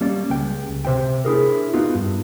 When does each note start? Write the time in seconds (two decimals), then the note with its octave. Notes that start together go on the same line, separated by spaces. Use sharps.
0.01 G3 A#3 C#4 D5
0.30 C#2 G5
0.85 C3 C5 E5 G5
1.25 D4 E4 G#4 A#4
1.73 B3 D#4 F4 F#4
1.95 G2